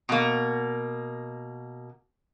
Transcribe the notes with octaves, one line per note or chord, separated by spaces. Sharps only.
B2 A#3